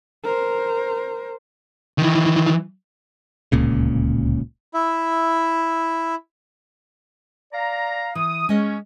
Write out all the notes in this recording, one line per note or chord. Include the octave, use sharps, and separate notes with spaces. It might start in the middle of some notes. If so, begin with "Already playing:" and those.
A#4 C5
D#3 E3
D1 C#2 A#2 C#3
E4 E5
D5 F5 A#5
E3 D#6
G#3 C#4 D#5